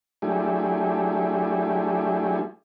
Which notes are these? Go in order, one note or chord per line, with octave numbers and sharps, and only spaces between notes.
F#3 A3 D4 E4 G4 G#4